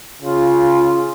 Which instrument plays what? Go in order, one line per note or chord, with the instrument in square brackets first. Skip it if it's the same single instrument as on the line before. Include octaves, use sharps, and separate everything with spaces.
[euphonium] C#3 [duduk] F4